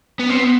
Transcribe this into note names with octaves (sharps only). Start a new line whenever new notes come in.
B3
C4
B3